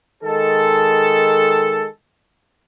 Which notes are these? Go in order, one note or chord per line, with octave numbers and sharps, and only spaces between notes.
D#3 G#3 A4